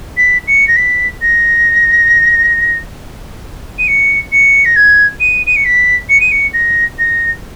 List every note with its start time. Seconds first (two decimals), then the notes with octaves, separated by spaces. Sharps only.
0.17 B6
0.48 C#7
0.68 A#6
0.77 B6
1.22 A#6
3.79 D#7
3.88 C#7
4.32 C#7
4.65 A#6
4.76 G#6
5.20 D#7
5.47 D#7
5.56 C#7
5.65 B6
6.09 C#7
6.21 D#7
6.32 C#7
6.54 A#6
6.99 A#6